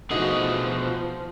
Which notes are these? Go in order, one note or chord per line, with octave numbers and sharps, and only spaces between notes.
B2 F3 A3 D#4 F#4 G#4